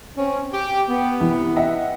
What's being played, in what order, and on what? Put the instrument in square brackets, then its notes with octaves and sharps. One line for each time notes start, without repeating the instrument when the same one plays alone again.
[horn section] C4 C#4
G4
B3
[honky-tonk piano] C2 E3
D#5 E5 F#5